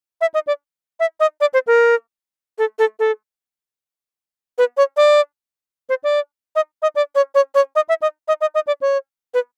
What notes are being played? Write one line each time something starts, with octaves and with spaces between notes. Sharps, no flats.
E5
D#5
D5
E5
D#5
D5
C5
A#4
A4
A4
A4
B4
C#5
D5
C5
D5
D#5
D#5
D5
C#5
C#5
C#5
D#5
E5
D#5
D#5
D#5
D#5
D5
C#5
B4